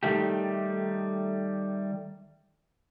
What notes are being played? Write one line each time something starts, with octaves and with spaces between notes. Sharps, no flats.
D#3 G3 A3 G4